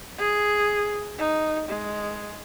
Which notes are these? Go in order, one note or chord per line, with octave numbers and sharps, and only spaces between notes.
G#4
D#4
G#3